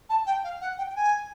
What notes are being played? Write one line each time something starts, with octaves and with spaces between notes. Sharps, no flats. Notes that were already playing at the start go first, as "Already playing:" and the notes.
A5
G5
F5
F#5
G5
G5
G#5